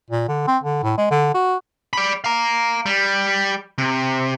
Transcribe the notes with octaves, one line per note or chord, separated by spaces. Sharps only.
A#2
D3
C4
D3
A2
G#3
D3
F#4
D5 B5
F5 A#5
G3
C3